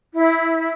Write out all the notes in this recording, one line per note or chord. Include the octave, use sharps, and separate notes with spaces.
E4